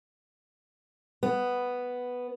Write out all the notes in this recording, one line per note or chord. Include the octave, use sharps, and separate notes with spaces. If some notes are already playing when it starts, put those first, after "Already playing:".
B3